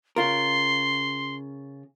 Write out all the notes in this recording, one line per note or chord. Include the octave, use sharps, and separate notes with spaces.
C#3 F4 A#4 C6